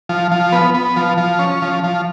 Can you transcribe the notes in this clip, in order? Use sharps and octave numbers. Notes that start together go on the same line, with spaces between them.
F3
F3
B3
B3
F3
F3
C#4
F3
F3